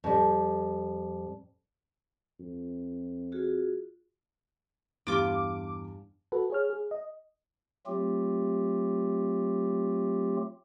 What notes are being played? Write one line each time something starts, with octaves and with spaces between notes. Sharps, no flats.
F2 G3
F2
F4 F#4 G#4
E2 G2 G3 F4 G4 D6
F#4 A4 B4
G#4 C#5 F6
G#4
D#5
F#3 A3 C4 F4 G4